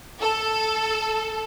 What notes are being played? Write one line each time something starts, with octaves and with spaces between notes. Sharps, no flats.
A4